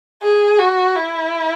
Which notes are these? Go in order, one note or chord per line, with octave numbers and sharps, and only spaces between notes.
G#4
F#4
E4